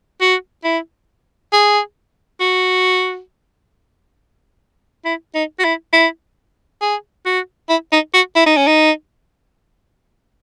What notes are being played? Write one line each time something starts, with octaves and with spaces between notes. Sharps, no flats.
F#4
E4
G#4
F#4
E4
D#4
F#4
E4
E4
G#4
F#4
E4
D#4
F#4
E4
D#4
C#4
D#4